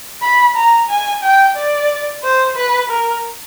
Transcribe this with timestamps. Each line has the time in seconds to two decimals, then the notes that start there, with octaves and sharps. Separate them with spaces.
0.22 B5
0.56 A#5
0.90 G#5
1.23 G5
1.56 D5
2.23 C5
2.56 B4
2.90 A#4